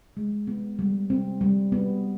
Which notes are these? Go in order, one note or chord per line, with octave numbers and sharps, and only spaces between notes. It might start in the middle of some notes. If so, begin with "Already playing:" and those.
G#3
B3
G3
C4
G3
B3